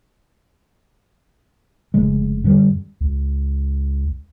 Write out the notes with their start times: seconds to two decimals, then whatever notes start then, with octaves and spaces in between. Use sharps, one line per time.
1.94 F1 C#3 G#3
2.44 F#2 D3 E3 G3
3.01 C#2